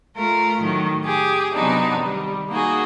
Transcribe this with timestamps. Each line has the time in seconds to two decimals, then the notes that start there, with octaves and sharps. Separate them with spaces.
0.17 A3 F4 A#4
0.61 A2 D#3 F#3
1.04 G4 G#4
1.54 C3 F#3 B3 D4 D#4
1.99 D#3 G3
2.49 A#3 D#4 F#4 G#4